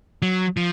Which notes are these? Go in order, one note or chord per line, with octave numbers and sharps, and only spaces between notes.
F#3
F3